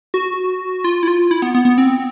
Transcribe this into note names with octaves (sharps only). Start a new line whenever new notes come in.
F#4
F4
E4
F4
E4
B3
B3
B3
C4